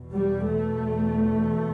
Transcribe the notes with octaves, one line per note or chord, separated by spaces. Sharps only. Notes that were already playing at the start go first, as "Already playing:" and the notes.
Already playing: E2 B2
G3
A3